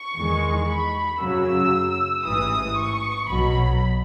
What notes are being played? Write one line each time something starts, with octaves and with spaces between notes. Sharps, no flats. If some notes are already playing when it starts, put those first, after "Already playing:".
Already playing: C#6
E2 D#3 G#3
B5
F#2 C#3 F#3 E6
A1 G#2 E3 D#6
C#6
B1 B2 F#3 B5